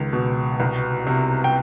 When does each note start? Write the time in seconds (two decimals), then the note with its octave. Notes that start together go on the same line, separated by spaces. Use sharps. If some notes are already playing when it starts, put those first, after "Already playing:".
Already playing: C#2 D#3
0.13 B2
0.60 C2
1.07 C3
1.44 G5